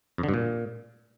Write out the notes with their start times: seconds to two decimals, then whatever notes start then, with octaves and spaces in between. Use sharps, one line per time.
0.18 F2
0.23 D3
0.29 G2
0.34 A#2